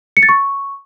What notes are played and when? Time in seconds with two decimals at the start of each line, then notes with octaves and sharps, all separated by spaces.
0.17 C#7
0.23 A6
0.29 C#6